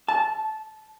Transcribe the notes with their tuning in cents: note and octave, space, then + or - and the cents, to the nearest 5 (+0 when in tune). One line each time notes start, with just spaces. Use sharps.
A5 -15